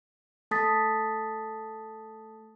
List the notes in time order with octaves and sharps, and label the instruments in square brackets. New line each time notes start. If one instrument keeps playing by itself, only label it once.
[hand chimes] A3 A4 A5 D#6 A6 B6